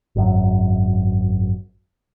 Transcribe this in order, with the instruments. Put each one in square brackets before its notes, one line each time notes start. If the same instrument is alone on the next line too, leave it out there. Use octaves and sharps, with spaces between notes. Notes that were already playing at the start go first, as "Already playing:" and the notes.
[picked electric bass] G#1 F#2